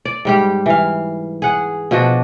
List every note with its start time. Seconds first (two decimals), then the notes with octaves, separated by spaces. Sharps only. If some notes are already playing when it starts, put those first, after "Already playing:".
0.05 D5
0.25 G#2 G3 G4
0.66 E3 F5
1.42 G#4 F#5
1.91 B2 F3 D4 F#4